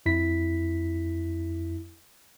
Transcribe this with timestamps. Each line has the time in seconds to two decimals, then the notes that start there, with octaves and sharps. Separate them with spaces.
0.06 F2 E4 B6